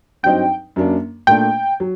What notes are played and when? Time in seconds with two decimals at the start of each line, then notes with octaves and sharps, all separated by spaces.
0.23 G2 F#3 C4 D#4 G5
0.76 F#2 F#3 A#3 D4
1.27 A#2 A3 D4 G5
1.80 F#3